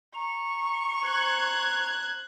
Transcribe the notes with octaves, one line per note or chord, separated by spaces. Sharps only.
A#5 C#6
C5 F#6 G#6